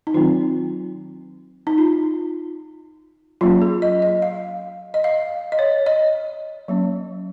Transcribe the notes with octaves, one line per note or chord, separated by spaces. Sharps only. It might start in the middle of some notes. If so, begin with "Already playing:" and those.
D#4
D#3 F#3 C4 F4
D#4
F4
F#3 A#3 C#4 F4
G#4
D#5
D#5
F5
D#5
F5
D#5
C#5
D#5
F#3 A#3 C#4